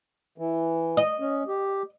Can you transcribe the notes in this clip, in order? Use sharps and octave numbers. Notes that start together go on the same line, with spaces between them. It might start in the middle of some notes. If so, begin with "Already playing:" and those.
E3
D#5
C#4
G4